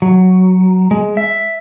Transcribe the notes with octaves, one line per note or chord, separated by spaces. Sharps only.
F#3
G#3
E5